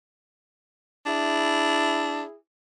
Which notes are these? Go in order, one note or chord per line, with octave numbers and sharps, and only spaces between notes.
D4 E4 G#4